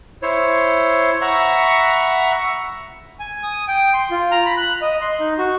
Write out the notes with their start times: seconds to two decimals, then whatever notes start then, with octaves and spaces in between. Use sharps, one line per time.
0.23 E4 C5 C#5
1.21 E5 F#5 A#5 B5 C#6
3.20 G#5
3.43 D#6
3.68 G5
3.94 C6
4.11 F4
4.31 A#5
4.46 B5
4.57 F#6
4.82 D#5
5.01 C6
5.20 D#4
5.38 F#4